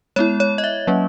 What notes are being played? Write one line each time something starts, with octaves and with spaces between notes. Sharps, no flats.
G#3 B3 E4 C#5
C#5
D#5
E5
F#3 A#3 C#4